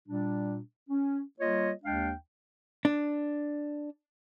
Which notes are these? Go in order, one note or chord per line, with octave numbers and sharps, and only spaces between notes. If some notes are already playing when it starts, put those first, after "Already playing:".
A#2 G3 D4
C#4
G3 A#3 F4 C#5 D#5
D#2 G#3 D4 F5 G5
D4